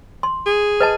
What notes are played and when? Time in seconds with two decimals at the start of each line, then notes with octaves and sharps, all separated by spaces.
0.23 C6
0.46 G#4
0.80 B4 D#5 A5